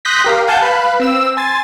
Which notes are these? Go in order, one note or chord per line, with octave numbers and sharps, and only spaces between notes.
C6 D#6 F#6 G6 A#6 B6
G4 A#4 F5
F5 F#5 G#5 A5 G6
B4 F5 B5
C4 E6 E7
G#5 C6 A6